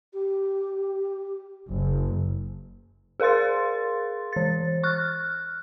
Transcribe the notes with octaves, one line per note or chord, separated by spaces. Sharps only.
G4
F#1
G#4 A#4 F5 C6 A6
E3 A6
C#6 F6 F#6